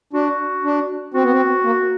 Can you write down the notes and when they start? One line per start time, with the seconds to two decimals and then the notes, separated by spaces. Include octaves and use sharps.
0.13 D4 F#4
0.64 D4
1.14 C4 F#4
1.23 B3
1.32 C4
1.64 A#3